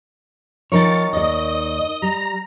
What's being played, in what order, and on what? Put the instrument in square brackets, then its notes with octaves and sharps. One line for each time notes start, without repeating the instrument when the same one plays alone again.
[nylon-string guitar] F3 [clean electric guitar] D#4 A#4 C#5 [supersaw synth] A6 C#7
[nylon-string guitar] D#2 D5 [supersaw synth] D#5
[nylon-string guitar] G3 [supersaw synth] A#5